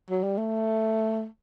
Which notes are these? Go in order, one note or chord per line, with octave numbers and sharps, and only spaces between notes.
F#3
G3
A3